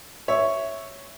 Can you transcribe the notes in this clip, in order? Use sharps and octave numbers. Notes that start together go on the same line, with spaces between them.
C#5 E5